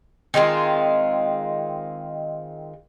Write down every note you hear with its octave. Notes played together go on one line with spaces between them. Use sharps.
D#3 G#3 C4 F4